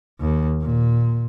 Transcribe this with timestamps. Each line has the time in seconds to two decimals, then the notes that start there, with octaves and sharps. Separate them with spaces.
0.20 D#2
0.62 A#2